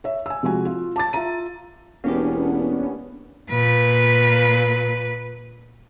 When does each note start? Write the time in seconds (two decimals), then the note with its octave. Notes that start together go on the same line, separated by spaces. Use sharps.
0.04 C#5 E5
0.26 G#5 E6
0.43 C3 F3 G#3 F#4 G#5
0.65 F4
0.96 A5 D6 A6
1.13 F4 E5 A#5 D#7
2.04 E1 A#3 B3 C#4 D4 G4
3.50 A#2 B4